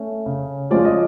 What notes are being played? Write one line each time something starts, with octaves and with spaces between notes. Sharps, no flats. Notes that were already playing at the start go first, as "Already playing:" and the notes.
Already playing: A3 C#4
C#3
F3 G#3 C#4 F4 D5
D#5